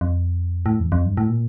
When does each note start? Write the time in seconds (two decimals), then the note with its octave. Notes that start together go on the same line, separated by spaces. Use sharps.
0.01 F2
0.66 A2
0.80 E2
0.92 F2
1.05 G2
1.17 A2
1.30 A#2